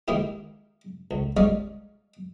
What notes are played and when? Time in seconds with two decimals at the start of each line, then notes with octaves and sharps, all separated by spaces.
0.08 D#3 G#3 A#3 D#4 E4 G4
1.11 C#2
1.37 G3 G#3 D#4 C#5 D5 F5